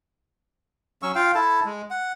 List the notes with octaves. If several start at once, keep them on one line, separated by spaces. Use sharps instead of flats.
F#3 C#4 C#6 E6
F4 F5 G5
E4 A4 A5
G#3
F#5